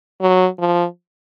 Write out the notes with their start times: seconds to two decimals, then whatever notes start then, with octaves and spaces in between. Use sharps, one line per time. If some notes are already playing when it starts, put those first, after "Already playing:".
0.21 F#3
0.59 F3